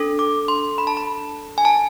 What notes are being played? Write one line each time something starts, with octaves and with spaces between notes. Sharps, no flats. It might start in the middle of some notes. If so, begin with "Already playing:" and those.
Already playing: D4 A4
D6
C6
B5
A5
B5
G#5
A5